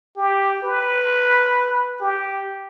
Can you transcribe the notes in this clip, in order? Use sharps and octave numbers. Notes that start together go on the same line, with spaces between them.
G4
B4
G4